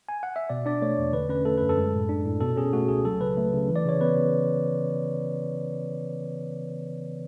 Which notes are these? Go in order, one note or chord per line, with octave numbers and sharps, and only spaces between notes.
G#5
F#5
E5
B2 D5
D4 D5
A3 C#5
E2
D3 B4
C#4 B4
A3 A4
F#2 B4
A4
G#3
A2
D4
A2
B2 A4
C#4 G#4
A3 F#4
C#2 G#4
F#3 A4
C#3 B4
A3
C#3
E3
D5
C#3 C#5
B3 B4
C#3